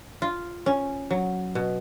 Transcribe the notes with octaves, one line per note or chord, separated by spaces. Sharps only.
F4
C#4
F#3
B2